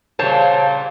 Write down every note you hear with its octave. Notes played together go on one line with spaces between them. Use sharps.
A#2 C#3 G3 C5 C#5 A5